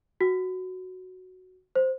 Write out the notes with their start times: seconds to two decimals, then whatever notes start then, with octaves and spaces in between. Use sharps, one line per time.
0.21 F#4
1.75 C5